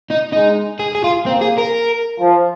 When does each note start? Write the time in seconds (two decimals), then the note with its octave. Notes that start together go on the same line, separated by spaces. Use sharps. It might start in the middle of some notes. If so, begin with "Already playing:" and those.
0.11 D#4
0.33 G#3 D#4
0.80 G#4
0.95 G#4
1.04 F4
1.26 A#3 C4
1.42 G#4
1.58 A#4
2.20 F3